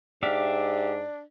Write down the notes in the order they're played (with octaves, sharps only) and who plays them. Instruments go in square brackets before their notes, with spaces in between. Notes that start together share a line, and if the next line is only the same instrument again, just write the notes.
[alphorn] G#2 [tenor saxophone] D4 [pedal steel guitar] G4 E5 F5